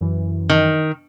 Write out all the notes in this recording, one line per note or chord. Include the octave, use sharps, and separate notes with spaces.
F#2 E3
D#3